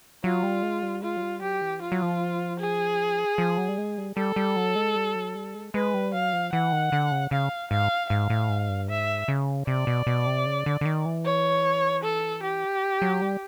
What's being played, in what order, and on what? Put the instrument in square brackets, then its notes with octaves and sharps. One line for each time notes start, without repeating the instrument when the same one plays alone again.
[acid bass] F#3 [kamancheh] F4
[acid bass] G3
G#3
G3
[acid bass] G#3 [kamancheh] F4
[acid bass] F#3
G3
[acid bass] F#3 [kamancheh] G4
[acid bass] E3
[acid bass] F3 [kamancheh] F4
[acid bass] F#3
F3
[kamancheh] G#4
[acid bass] F3
F#3
G3
G#3
G3
[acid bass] G3 [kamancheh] A4
[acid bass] G3
F#3
G#3
G3
F#3
G3
G#3
[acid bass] G#3 [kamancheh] B4
[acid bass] G3
[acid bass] F#3 [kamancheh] F5
[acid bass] F3
[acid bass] E3 [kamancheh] F#5
[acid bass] D#3
D3
C#3
[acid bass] C#3 [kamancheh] F5
[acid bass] G#2 [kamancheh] F5
[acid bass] G#2 [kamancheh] F5
[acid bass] A2
G#2
G2
[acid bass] G#2 [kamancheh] E5
[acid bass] C#3
[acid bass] C3 [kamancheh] D5
[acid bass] B2
B2
C3
C#3
D3
D3
D#3
E3
[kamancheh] C#5
A4
G4
[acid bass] F#3
G3